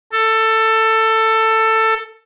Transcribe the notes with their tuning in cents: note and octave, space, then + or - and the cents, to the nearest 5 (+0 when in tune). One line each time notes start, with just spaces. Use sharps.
A4 +15